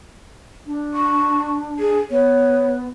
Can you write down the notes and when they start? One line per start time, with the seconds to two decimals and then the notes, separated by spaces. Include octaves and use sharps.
0.67 D4
0.94 C#6
1.79 G#4
2.10 B3 C#5